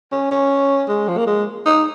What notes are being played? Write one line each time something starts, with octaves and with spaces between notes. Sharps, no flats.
C#4
C#4
G#3
F3
A#3
G#3
D#4